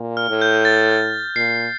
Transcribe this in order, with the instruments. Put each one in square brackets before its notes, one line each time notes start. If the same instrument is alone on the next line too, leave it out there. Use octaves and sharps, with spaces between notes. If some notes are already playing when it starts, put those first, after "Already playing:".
Already playing: [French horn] A#2
[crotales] F6
[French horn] A2
[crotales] G6
A6
[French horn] A#2 [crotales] C7